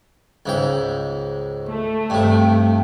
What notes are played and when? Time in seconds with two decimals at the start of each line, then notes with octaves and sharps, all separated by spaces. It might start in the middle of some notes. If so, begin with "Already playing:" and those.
0.46 C#2 G#2 G5
1.68 A3
2.10 G2 C3 G5